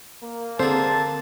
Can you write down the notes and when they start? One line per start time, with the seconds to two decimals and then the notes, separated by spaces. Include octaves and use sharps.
0.23 A#3
0.60 D3 C4 G#4 C5 A5